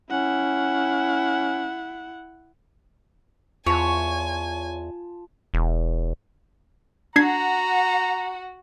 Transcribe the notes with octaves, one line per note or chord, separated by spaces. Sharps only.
C#4 E4 F#5
E2 F4 C#5 G#5 A5
E1
D4 F#4 F#5 A#5 G#6 C7